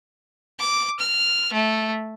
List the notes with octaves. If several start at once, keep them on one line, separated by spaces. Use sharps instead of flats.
D6
F6
A3